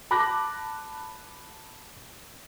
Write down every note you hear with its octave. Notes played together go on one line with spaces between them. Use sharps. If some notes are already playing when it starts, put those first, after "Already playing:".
A5 B5 D6 F#6 A#6